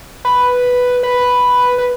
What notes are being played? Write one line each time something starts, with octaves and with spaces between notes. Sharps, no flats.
B4
B4
B4